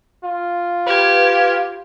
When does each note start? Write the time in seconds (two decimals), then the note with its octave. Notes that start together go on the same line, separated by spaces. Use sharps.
0.24 F4
0.87 G4 B4 F6 G#6